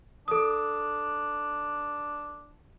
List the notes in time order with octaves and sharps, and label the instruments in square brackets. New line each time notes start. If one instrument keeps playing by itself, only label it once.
[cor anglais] D4 [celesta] A4 D#6